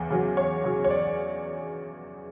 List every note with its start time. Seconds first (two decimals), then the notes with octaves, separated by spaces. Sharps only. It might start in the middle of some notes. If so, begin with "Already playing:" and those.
Already playing: E2 C#3
0.10 C#3 F#3
0.37 E2 C#5
0.64 C#3 F#3
0.84 C#5
0.89 E2 D5